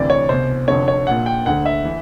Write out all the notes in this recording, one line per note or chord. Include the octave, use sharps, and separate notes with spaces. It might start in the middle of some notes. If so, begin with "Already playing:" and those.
Already playing: D2 C3 E3 D5
C#5
C2 B2 C5
F1 F2 D3 C#5
C#5
A#1 A#2 F#5
G5
D2 D3 F#5
E5
E3